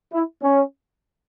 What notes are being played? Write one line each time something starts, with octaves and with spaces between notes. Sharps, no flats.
E4
C#4